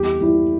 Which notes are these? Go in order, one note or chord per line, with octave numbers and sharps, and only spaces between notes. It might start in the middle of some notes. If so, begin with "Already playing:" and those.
Already playing: E2 G3 G4
G3 E4